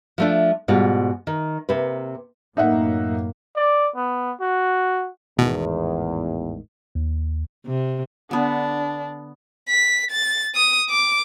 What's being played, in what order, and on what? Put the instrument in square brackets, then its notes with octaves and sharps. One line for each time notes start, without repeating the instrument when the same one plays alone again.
[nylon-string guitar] F3 A3 D4
G#2 B2 G3 F4
D#3
C3 A#3 B4
[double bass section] F#2 A2 A#3 [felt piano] D#4 E5 F#5
[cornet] D5
B3
F#4
[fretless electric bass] A1 G#2 D#3 [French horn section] E2 [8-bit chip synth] B2
[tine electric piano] D#2
[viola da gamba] C3
[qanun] D3 B3 [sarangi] D4
[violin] B6
A6
D#6
D6